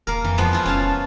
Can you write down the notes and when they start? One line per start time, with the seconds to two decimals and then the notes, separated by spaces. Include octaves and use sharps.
0.07 D#1 A#3 A#4
0.24 F2 E3
0.38 F3 G#3 B3
0.53 E4 F4
0.65 E1 C#4 F5 A5